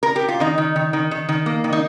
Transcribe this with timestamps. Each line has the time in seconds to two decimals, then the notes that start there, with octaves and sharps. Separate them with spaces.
0.03 A#4
0.16 G4
0.29 F4
0.40 D#3 D#4
0.58 D#3
0.76 D#3
0.93 D#3
1.11 D#3
1.29 D#3
1.46 A#3
1.64 D#3
1.73 D#4